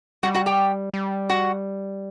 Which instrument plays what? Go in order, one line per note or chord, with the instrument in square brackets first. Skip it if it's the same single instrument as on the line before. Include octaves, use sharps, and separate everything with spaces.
[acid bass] G3 [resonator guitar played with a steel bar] F#4 F#5
[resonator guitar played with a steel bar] F#4 F#5
G4 G5
[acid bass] G3
[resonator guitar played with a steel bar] F#4 F#5